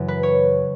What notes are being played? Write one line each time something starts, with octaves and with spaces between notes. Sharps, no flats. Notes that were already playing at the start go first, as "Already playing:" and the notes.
Already playing: F#2 C#3 E3
B4
C#5